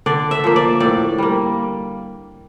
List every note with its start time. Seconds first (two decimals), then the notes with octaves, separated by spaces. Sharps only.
0.06 D3 D5
0.31 E5
0.44 F3 A#3
0.56 D5
0.80 A2 D5
1.18 G3 A#3